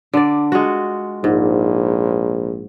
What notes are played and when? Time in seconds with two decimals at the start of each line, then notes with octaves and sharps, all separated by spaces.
0.13 D3 D5
0.52 G#3 F4 F#4
1.24 A#1 G#2